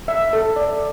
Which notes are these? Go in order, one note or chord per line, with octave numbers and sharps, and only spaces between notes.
E5
A4
D5